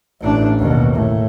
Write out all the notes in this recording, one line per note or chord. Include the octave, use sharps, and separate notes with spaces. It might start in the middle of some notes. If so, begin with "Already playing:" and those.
A1 D4
D#2 B2
A2